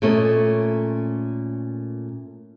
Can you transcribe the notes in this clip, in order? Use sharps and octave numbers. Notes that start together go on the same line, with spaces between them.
A#2 A3 C#4 D#5